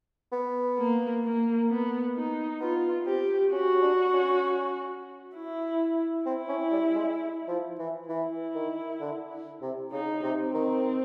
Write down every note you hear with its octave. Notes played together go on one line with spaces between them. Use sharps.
B3
A#3
A#3
B3
D#4
B3 F4
C4 G4
C#4 F#4
C#4
D4
C#4
E4
C4 E4
C#4
G3
G#3
F3
E3
E3 E4
D#3
D3
C3
C#3 D#4
C3
C4
D#3